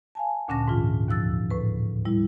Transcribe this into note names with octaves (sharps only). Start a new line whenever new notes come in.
F5 G#5 A5
D2 A#2 D3 C#4 A5 A#6
G#2 E3 F4
D#2 F3 E6 A6
A2 B4
G3 E4